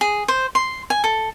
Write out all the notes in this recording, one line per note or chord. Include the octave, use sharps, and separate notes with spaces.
G#4
C5
C6
G#5
A4